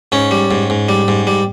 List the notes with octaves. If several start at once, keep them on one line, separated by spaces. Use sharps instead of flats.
G#2 C#4
G3
G#2
G#2
G3
G#2
G3